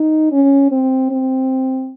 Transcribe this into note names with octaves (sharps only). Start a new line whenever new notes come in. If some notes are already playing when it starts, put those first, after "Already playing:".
Already playing: D#4
C#4
C4
C4